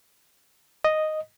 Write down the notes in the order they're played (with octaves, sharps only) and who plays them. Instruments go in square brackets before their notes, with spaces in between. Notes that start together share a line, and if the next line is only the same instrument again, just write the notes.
[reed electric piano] D#5